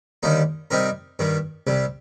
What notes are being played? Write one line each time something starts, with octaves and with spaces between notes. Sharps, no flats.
D#2 D3 G3 A#3 D#4
C3 G3 C4 D#4 A#4
G2 D#3 G3
C2 C3 G3